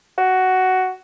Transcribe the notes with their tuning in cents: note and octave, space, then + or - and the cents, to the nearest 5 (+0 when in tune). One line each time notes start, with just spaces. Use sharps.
F#4 +10